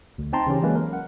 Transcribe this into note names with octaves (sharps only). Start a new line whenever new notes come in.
D2
C4 D#4 G5 A5 A#5 C6
C#3 E3 C#4 G4
E3 F#3 G#3 A#3 C#4 B4
A#4
F#5